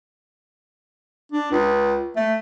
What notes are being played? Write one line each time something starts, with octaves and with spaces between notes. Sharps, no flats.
D4
C#2
A3